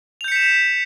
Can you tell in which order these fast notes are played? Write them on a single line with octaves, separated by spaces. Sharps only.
F7 G6 C#7 B6 E7